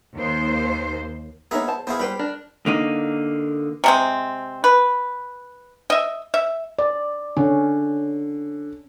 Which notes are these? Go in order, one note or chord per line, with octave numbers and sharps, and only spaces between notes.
D#2 C5
A#3 B3 D#4 G#4 C#5 E5
C5 A5
B3 E4 G#4 C5 F5
G3 B4 C5 G5 B5
D4 A#4 D5
D3 A#3 D#4
C3 G#3 C4
B4
D#5 E5
E5
D5
D3 C#4